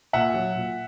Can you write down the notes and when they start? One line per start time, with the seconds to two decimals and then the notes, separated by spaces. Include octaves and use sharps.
0.13 A#2 E5 F#5
0.34 F#3
0.55 A#2